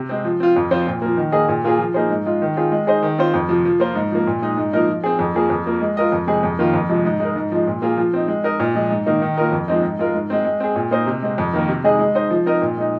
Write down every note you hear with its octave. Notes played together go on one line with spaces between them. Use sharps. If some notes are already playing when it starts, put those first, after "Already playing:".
Already playing: C3
G#3 C4
F3
C4 F4
F2
F3 C4 F4 C5
A#2
F3 A#3
D#3
A#3 G#4 D#5
A#2
A#3 F4 G#4
F3
A#3 D#4 G#4 C5
G#2
G#3 F4
D#3
C4 F4 G#4
G#3
D#4 G#4 C5 D#5
D#3
C4 F4 C5
F2
C3 F3
F3
A#3 F4 C5
G#2
F3 A#3
A#2
G#3 D#4
G#2
F3 A#3 D#4 A#4
F3
C4 G#4
F2
F3 A#3 G#4
F2
F3 A#3
G#3
F4 A#4 D#5
F2
C3 G#3 C4 G#4
F2
D#3 A#3 F4
F2
C3 F3 G#3
G#2
G#3 D#4 A#4
G#2
F3 G#3
A#2
A#3 F4 G#4
F3
C4 D#4
G#3
D#4 A#4 D#5
A#2
F3 G#3
G#2
D#3 A#3 D#4
D#3
A#3 F4 A#4 D#5
F2
F3 G#3 C4 D#4
G#2
G#3 F4 A#4
G#2
G#3 C4
G#3
C4 G#4
A#2
A#3 D#4 C5 D#5
C3
G#3 C4
F2
D#3 A#3
C3
G#3 D#4 G#4 D#5
G#3
D#4 C5 D#5
F3
C4 D#4 A#4 D#5
A#2
G#3 D#4